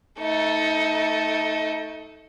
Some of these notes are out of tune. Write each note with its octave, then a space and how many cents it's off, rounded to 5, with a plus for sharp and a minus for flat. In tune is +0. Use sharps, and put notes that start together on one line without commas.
A3 +0 D#4 +25